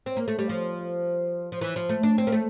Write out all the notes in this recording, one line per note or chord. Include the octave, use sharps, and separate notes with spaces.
C4
A#3
A3
G3
F3
F3
E3
F3
A3
D4
C4
A#3
A3